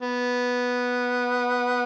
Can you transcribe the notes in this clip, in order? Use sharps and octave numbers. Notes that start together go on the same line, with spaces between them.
B3